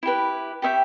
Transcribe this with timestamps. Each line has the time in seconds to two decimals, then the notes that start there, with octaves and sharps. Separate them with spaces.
0.03 E4 G4 B4
0.62 G4 C#5 E5 G5